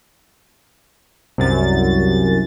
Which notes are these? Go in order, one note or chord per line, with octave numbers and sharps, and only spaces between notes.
C2 F#2 A6